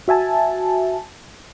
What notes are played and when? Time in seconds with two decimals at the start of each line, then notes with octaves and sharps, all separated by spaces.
0.08 F#4 E5 G#5 A5